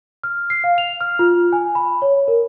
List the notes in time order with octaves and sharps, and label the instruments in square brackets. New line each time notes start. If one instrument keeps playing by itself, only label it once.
[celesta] F6
C7
F5
F7
F6
F4
G#5
B5
C#5
A#4